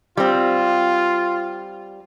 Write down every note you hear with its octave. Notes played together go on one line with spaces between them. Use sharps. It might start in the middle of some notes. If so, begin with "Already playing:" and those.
G3 C4 F4